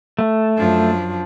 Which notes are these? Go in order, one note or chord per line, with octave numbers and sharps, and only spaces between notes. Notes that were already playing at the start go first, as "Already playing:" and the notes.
A3
F#2 F3 D4